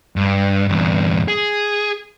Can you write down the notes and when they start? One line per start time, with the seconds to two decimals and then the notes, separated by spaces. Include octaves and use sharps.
0.16 G2
0.68 E2 G2
1.28 G#4